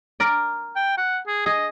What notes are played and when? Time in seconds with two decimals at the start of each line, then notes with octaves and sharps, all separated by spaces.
0.20 A#4 D5
0.76 G5
0.97 F#5
1.27 G#4
1.46 G#4 D#5